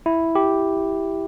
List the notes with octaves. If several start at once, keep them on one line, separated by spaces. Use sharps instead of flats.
E4
G4